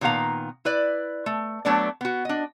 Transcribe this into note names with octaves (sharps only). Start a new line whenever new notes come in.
A#2 D#3 B3 F#4 F5 A#5
E4 B4 D5
A3
F#3 A3 B3 D4 A4 D5
B3 F#4
D4 D#5